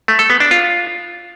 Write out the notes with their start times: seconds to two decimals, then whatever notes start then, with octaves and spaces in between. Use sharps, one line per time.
0.08 A3
0.19 A4
0.30 B3
0.40 D4
0.51 F4